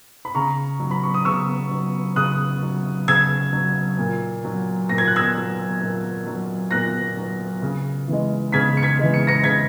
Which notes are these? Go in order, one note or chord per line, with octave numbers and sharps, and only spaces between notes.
B5
C#3 A#5 C#6
F#3
B5
C#6
D#6
C#3 C#6 E6
F#3
C#3 D#6 F#6
F#3
C#3 E6 G#6
F#3
A#2
F#3
A#2 A#6
G#6
F#6
E6 G#6
F#3
A#2
F#3
A#2 F#6 A#6
F#3
C#3
E3 G#3
C#3 G#6 B6
C#7
G#6 B6
E3 G#3
C#7
A#6 C#7
C#3 G#6 B6